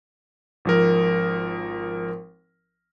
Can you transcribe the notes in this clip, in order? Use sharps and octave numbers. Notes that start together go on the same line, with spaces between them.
G#1 F3 A#4